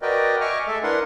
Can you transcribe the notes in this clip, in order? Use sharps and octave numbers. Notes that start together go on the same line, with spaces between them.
F#4 A#4 B4 D5 D#5 G5
D#5 E5 G#5 C#6 D6 F6
G#3 A3 A4 E5
D4 E4 A#4 B4 F#5 C6